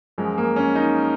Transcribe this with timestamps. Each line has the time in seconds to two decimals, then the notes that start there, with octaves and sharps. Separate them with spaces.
0.18 F#2 F3 G#3
0.38 A#3
0.56 C#4
0.75 D#4